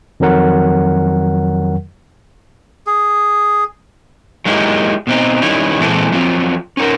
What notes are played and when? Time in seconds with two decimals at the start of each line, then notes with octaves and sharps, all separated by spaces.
0.20 F2 D#3 F#3 A#4 F#5
2.87 G#4
4.45 F#3 G#3 A#3 D#4 E4 G4
5.07 B2 C4 D#4
5.42 D#3 G3 C#4 D#4 E4
5.80 A#2 E3 G#3 C4 E4 A4
6.12 F3 F#3 C4 D#4 F4
6.77 C#4 D#4 A#4